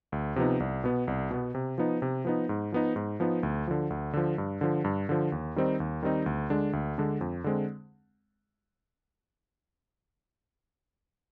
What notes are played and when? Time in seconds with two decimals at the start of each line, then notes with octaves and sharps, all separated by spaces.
0.12 D2
0.36 C3 F3 B3 D#4
0.60 C2
0.84 B2 B3
1.07 C2
1.30 B2 B3
1.55 C3
1.78 F3 B3 D#4
2.02 C3
2.25 F3 B3 D#4
2.49 G#2
2.72 F3 B3 D#4
2.96 G#2
3.20 F3 B3 D#4
3.43 D2
3.67 D3 F3
3.90 D2
4.13 D3 F3
4.38 G2
4.61 D3 F3
4.84 G2
5.09 D3 F3
5.32 D#2
5.56 D#3 G3 C4 D#4
5.80 D#2
6.03 D#3 G3 C4 D#4
6.26 D2
6.50 D3 G#3 D4
6.73 D2
6.98 D3 G#3 D4
7.21 F2
7.44 D3 G#3 C4